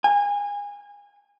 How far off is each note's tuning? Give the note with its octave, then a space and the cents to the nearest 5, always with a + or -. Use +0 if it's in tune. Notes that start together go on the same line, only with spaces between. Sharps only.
G#5 -25